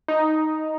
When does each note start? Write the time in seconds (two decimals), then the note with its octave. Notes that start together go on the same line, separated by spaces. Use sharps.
0.08 D#4